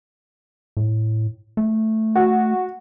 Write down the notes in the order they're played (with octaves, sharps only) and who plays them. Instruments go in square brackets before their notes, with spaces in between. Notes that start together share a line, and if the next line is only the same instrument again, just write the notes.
[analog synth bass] A2
A3
[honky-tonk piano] F#4